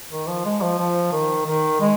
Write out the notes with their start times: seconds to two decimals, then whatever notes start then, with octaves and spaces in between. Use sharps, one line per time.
0.11 D#3
0.28 F3
0.45 G#3
0.62 F3
0.78 F3
1.12 D#3
1.46 D#3
1.80 G#3